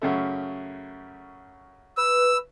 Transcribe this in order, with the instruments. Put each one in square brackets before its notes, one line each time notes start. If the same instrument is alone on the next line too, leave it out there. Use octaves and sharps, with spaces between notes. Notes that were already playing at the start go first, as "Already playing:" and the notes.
[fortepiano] F#2 C#3 A3
[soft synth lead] B4 [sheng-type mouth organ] E6